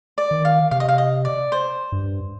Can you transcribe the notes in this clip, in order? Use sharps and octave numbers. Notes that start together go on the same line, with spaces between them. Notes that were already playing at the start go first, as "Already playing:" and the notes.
D5
D#3
F5
C3 F5
D#5
F5
D#5
D5
C5
G2